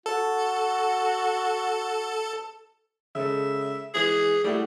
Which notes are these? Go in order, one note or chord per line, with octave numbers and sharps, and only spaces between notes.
F#4 A4
C#3 G#3 A4 E5
E3 G#3 G#4
G3 A3 E4 F#4